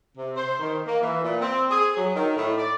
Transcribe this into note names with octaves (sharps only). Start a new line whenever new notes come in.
C3
C5
D#3
A#3
E3
A#2
C4
G#4
F#3
D#3
A2
D5